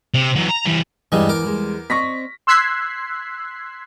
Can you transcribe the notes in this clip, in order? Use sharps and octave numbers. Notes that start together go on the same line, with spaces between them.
C3
F#2 E3
A#5
E3 G3
E2 G2 E3 G3 G#3
A#4 D6
G3 G#3
C4 D5 D#5 C#6 A#6 B6
C6 E6 F#6 G#6 B6 C7